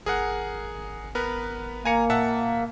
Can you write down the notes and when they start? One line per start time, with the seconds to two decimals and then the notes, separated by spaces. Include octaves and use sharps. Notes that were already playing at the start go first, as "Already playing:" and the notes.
0.06 G#1 G#4 A#4 F#5
1.15 B3 A#4 B4
1.85 A#3 G#5 A#5 C#7
2.10 A#2 E5 F#5 A5